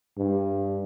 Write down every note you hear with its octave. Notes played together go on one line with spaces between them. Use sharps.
G2